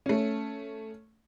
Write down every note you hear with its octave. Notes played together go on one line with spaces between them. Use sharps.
A3 C#4